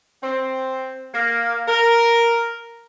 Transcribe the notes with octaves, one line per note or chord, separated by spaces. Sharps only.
C4
A#3
A#4